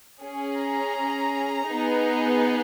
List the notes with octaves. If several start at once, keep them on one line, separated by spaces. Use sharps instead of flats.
C#4 G#4
A#5
B3 D#4 G#4